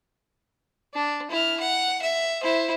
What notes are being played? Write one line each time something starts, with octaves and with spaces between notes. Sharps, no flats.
D4
E4 F6
F#5
E5
E4 C5